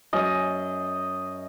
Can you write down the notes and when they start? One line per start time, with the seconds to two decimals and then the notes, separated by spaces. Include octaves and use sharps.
0.13 F#2 D#5